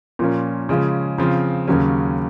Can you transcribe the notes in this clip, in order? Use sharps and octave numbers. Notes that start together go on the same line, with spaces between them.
A#2 F3 A#3 C#4
C#3 F3 G#3 C#4
C#3 F3 C4
D#2 C#3 F#3 C#4